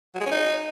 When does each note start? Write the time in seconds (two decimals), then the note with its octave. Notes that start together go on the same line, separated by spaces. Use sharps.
0.15 F#3
0.20 G#3
0.26 C#4
0.31 D#4